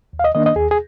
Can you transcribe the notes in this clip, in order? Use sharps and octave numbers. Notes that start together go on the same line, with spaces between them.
D#2
F5
D#5
D#3 A#3 D4 D#5
D#5
D#2 G#4
G#4